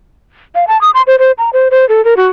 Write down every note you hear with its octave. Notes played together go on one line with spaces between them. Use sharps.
F5
A5
D#6
C6
C5
C5
A#5
C5
C5
A4
A#4
F#4